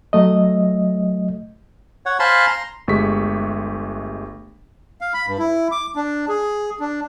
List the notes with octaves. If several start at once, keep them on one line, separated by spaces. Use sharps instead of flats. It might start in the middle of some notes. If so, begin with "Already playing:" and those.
F#3 A3 D#5
C#5 F#5
C5 F5 G#5 A5 B5 C6
A#5 C6
G1 G#3 A3 G4 C#6 B6
F5
B5
G2
E4
D6
D4
G#4
D4